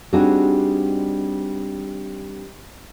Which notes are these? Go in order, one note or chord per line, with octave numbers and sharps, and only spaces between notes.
G3 C4 D4 D#4 F#4 G#4